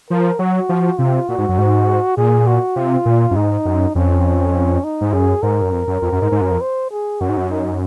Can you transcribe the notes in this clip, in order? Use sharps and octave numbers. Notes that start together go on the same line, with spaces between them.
F3 A#4
F#3 F#4
F3
C3 F4
A#2 F#4
G#2
F#2
G#2
A#2 G#4
F#4
C3 F4
A#2
F#2
G#2 D#4
F#2
F2 C#4
D#4
G#2
F#2 G#4
G#2 A#4
F#2
F2
F#2
F2
F#2
G#2
G#2
F#2
F2
C5
G#4
F#2 F#4
G#2
F#2
D#4